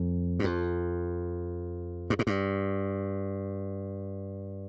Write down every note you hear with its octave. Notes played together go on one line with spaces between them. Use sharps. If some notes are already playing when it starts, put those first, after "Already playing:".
Already playing: F2
G2
F2
G2
G#2
G2